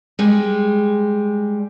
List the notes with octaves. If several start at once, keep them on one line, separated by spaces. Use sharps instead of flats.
G3 G#3